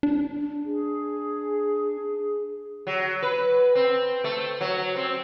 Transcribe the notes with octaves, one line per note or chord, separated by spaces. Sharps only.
D4
G#4
F#3
B4
C4
A3
F#3
C4